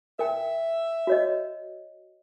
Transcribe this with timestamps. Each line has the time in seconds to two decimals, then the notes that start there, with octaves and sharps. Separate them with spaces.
0.19 A#4 E5 G5
1.07 F#4 C#5 D#5